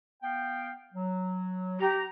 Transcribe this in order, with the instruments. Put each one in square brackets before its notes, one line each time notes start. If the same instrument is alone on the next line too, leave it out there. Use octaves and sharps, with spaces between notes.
[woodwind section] B3 F5 G5
F#3
[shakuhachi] G4 [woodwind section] A#5